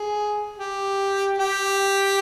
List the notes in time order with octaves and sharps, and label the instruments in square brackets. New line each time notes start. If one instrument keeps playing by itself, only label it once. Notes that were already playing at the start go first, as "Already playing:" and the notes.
Already playing: [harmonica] G#4
G4
G4